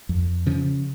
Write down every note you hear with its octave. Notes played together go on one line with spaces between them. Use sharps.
F2
C#3 F3